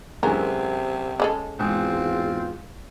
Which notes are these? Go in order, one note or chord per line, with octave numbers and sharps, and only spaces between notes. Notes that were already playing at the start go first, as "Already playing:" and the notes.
F#2 C3 E3 G#3 A#4
C#3 G#3 A4
G#1 E2 G#2 C4 F4